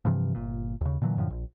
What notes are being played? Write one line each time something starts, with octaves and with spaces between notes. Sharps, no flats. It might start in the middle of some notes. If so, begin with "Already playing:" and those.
G2 C3 E3 F3
G1 A#2
D#2 C#3
A#2 D3 E3 F#3
F#2 A2 D3 F3
A#1